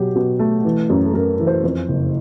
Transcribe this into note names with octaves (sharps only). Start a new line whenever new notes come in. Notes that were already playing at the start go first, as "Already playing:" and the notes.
Already playing: B2 F#3 F#4 G4
B2
A3
E3
F#2
A4
F#2 A#4
E3
C5
F2 C5
F#1